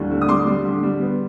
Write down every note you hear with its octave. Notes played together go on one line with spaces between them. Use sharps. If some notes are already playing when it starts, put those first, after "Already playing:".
Already playing: D#2 A2 D3 G3
D3
D#6
G3 C6 D6
G3
D3
G3
B3